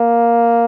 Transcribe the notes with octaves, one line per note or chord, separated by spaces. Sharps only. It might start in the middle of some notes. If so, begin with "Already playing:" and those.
Already playing: A#3